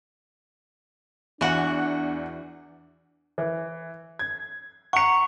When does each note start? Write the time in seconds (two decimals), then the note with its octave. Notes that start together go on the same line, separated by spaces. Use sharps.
1.41 E2 E3 D4 F#4 F#5
3.38 E3
4.19 G#6
4.93 F#5 A#5 C#6 C#7